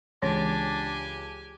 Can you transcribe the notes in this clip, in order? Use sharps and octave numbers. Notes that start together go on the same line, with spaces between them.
C#2 E3 D4 G4 G#5